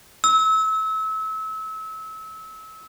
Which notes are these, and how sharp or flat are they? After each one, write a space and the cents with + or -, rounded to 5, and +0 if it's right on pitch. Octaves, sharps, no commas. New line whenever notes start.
E6 -30